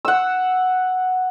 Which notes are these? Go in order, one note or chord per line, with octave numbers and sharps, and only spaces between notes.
F#5 E6